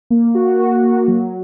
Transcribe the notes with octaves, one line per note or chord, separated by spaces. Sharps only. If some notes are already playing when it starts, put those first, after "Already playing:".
A#3
F#4
F#4
A#3
F#3